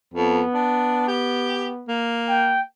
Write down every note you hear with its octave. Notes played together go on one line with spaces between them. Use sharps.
F2 B3
D4
G4
A#3
G5